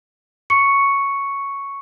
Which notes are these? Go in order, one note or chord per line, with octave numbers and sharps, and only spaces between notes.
C#6 C#7